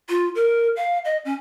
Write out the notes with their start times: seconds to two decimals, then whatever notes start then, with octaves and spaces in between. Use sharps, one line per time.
0.09 F4
0.35 A#4
0.76 F5
1.05 D#5
1.25 C#4